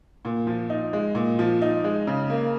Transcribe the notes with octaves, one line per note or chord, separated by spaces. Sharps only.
A#2
F3
D#4
G#3
A#2
F3
D#4
G#3
C#3
A#3